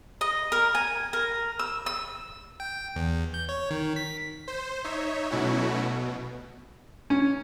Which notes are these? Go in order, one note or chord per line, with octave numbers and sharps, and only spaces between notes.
D#5
A#4
G#5
A#4
E6
E6
G5
E2
G6
C#5
D#3
B6
C5
D#4 C#5 E5
B2 F#3 A3 C#4 E4 F#4
B2
C#4